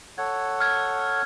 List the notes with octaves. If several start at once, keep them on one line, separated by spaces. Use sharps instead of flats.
A4 C#5 F#5 G#6
F6 G#6